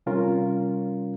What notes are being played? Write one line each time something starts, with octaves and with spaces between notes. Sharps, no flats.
C3 G3 C#4 F4 A#4